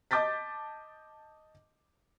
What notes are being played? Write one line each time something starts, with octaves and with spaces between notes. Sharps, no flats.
D#5 A5 D6 G6 A6 B6